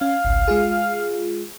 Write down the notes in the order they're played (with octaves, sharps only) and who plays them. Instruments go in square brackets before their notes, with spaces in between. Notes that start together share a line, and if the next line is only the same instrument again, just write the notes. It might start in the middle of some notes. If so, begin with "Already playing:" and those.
[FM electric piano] C#4 [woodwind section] F5
[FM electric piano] G#1 C#2
G#3 F4 G#4